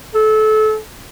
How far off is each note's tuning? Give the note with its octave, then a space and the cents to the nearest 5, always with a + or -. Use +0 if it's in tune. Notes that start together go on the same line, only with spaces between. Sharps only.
A4 -25